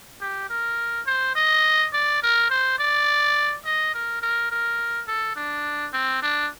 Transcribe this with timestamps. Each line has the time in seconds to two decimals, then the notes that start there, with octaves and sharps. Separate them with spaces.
0.21 G4
0.49 A#4
1.07 C5
1.36 D#5
1.93 D5
2.22 A#4
2.50 C5
2.79 D5
3.65 D#5
3.94 A#4
4.22 A#4
4.51 A#4
5.08 A4
5.36 D4
5.93 C4
6.23 D4